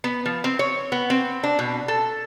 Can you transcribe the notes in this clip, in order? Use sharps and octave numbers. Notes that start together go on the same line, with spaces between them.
B3
F3
C4
C#5
B3
C4
D4
B2
A4